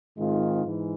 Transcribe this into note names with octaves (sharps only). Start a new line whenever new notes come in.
G#2 D#3 G#3 C4 F4
G#2 E3